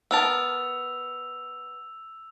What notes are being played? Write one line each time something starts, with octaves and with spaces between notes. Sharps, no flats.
B3 A#4 A5 E6 F7